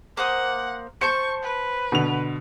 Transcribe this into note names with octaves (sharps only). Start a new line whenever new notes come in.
A#3 C5 F#5 D#6
C5 A5 C#6 G6 C#7
B4
B2 D3 F7